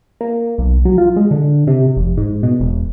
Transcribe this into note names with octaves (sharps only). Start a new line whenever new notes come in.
A#3
B1
F#3
F4
G#3
D3
C3
F1
G#2
B2
E1